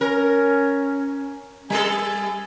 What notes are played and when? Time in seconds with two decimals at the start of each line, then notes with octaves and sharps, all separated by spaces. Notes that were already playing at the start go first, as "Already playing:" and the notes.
0.01 C#4 A#4
1.70 G3 G#4 A4 G#5